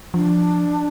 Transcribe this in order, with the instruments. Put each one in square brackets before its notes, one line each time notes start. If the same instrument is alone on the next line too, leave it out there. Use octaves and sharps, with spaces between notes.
[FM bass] F3 [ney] D4